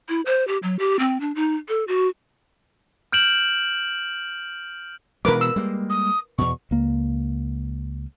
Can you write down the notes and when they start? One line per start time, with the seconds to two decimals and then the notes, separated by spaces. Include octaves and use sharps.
0.09 E4
0.26 C5
0.48 G4
0.63 F#3
0.79 G4
0.99 C4
1.21 D4
1.35 D#4
1.69 A4
1.88 F#4
3.12 F6 G6 D7 E7 F#7
5.25 B2 E3 G#3 A#4 B4 D6
5.41 E6
5.56 G3 G#3 A#3
5.90 D#6
6.38 E2 B2 C#6
6.71 C#2 A#3